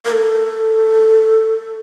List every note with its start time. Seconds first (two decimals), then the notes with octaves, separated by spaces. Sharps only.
0.05 A#4
0.12 A4